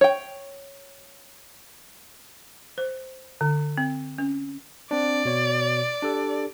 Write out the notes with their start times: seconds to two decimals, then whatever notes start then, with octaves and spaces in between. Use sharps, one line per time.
0.01 C#5 G5
2.78 C5
3.41 D3
3.78 C4
4.18 C#4
4.91 C4 D4 D5
5.25 B2 C#5
6.03 D4 G4 A4